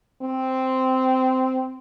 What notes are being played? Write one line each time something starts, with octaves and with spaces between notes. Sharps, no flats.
C4